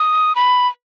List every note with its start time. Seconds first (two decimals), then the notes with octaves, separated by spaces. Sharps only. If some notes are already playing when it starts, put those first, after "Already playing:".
Already playing: D#6
0.36 B5